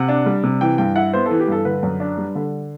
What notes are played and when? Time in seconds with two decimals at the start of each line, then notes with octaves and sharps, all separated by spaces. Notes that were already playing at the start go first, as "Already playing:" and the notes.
Already playing: C3 F#5
0.08 D4
0.26 G3
0.43 C3
0.61 E3 G5
0.78 G2 G5
0.95 E4 F#5
1.13 B3 C5
1.26 A4
1.31 E3
1.40 G4
1.48 G2 A4
1.65 D3 B4
1.83 F#2
2.00 D4
2.18 G3
2.35 D3